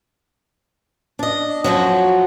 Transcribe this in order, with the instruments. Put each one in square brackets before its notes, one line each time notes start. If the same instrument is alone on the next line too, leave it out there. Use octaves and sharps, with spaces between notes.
[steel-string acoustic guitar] D4 D#5
F#2 F3 F#3